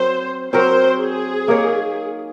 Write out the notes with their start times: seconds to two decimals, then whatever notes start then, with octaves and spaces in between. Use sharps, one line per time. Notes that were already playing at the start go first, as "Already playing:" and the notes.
Already playing: F#3 C4 F#4 A#4 C5
0.53 F#3 C4 F#4 A#4 C5
1.00 G#4
1.48 A#3 D#4 A#4 C#5